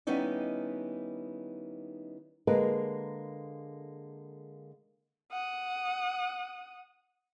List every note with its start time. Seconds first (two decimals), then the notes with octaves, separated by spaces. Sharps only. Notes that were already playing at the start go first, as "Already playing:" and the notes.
0.07 D#3 G3 B3 C#4 D#4 E4
2.47 D3 G#3 A#3 A#4 B4
5.32 F#5 D#6